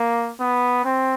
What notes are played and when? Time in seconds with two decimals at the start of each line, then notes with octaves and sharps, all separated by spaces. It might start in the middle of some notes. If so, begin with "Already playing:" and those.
Already playing: A#3
0.40 B3
0.84 C4